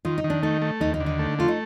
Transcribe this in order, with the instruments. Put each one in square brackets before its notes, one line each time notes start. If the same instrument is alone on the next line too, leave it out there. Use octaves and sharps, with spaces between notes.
[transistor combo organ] D#3 [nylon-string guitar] F4
[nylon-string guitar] D#4
[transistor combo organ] D#3
[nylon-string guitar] D4
[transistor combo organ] A3 [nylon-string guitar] D#4
[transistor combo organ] A3
[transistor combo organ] D#2 [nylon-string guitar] D#4
[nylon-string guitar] D#4
[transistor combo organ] D3
[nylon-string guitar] D#4
[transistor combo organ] A3
[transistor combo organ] A3 [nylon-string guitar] F4
[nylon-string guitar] D#4